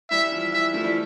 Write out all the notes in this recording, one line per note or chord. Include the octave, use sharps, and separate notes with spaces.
E3 G3 E5
F3
E3 E5
F3 A3
E3 G3